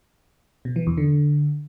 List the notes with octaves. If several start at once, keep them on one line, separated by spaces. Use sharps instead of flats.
B2
E3
E2
D3